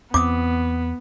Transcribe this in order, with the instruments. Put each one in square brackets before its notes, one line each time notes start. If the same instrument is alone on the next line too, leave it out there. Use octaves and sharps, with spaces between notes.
[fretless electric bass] E2 C4 [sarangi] B3 [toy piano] D6 D#6